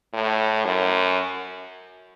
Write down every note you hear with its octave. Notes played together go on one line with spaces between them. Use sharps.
A2
F#2